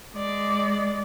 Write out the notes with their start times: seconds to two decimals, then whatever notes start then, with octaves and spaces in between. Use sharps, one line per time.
0.15 G#3 D5